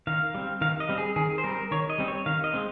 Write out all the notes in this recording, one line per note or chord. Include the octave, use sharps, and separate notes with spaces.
D#3 F5
G3 C4
D#3 F5
D#5
G3 C4
G#4
D#3 G#4
C5
G3 C4 A#4
D#3 C#5
D#5
G3 C4
C#5
D#3 F5
D#5
G#3 C4